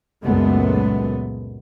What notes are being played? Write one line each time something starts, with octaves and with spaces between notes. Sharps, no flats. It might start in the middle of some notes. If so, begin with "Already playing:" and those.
C#2 F#2 A#2 G#3 A3 B3